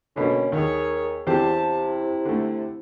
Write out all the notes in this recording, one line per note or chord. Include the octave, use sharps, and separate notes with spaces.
B2 D3 A#3 C#4
D#2 G#4 A#4 C#5
E2 C3 C4 G4 A5
E4
D3 A3